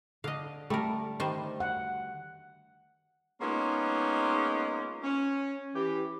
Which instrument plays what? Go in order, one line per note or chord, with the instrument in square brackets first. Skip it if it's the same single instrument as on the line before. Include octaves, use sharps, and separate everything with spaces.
[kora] D3 [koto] D#5 F5
[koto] G3 A#4 [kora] A3
[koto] D#3 G3 C5
[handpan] F#5
[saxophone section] G#3 A#3 B3 C#4 D#4 F4
C#4
E3 G4